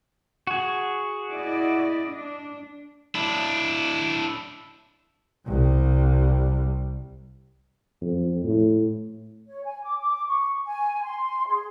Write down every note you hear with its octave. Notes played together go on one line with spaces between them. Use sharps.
F#4 G#4
E4 D5 D#5
D4
D4 E4
C2 G3
F2
A2
C#5
G#5
D6
D6
C#6
G#5
C6
G#4